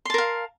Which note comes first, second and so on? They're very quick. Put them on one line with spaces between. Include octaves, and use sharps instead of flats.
C6 A5 A#4 F5